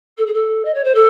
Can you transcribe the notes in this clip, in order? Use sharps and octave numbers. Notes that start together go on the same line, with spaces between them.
A4
G#4
A4
D#5
C#5
C5
A4